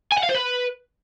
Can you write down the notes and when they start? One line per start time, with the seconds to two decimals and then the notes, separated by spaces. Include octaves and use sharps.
0.12 G#5
0.18 F#5
0.23 F5
0.29 C5
0.35 B4